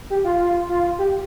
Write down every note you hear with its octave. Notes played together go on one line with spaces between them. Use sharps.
G4
F4
F4
F4
G4